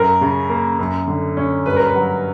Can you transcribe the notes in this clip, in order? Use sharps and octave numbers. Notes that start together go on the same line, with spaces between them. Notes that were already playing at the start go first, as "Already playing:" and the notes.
Already playing: F#2 A#4
C#3
A#3
F#2
D3
C#4
G2 B4
A#4
B4
F#3